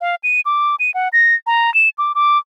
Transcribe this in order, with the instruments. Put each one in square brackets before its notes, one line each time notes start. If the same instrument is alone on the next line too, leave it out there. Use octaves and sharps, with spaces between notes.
[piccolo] F5
D#7
D6
D#7
F#5
A#6
A#5
E7
D6
D6